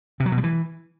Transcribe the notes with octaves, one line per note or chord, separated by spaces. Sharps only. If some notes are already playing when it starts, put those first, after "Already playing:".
C3
F#3
B2
G3
E3